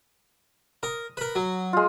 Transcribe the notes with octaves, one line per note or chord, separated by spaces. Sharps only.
A#4 D#6
A#4 B4
F#3
G#3 F4